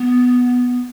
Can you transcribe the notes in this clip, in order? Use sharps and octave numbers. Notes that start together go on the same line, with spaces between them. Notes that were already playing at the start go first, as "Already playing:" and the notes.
Already playing: B3